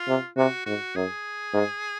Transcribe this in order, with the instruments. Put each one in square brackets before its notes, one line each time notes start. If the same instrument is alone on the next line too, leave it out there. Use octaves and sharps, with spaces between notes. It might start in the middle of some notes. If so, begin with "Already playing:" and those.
Already playing: [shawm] F4
[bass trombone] C3
[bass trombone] C3 [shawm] F#4
[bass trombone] G#2 [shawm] F#4
[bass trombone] F#2 [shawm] G#4
[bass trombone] G#2